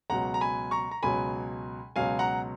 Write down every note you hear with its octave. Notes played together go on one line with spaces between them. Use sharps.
C#2 B2 F#3 F#5 A#5
A#5
G#5 B5
A#5 C#6
A#5
C#2 B2 F#3 G#5 B5
C#2 B2 F#3 F5 G#5
F#5 A#5